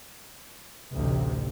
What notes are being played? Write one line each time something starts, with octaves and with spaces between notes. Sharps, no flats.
A1 D2 C3